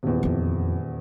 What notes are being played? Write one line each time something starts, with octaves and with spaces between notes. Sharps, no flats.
D#1 E2
F2 F4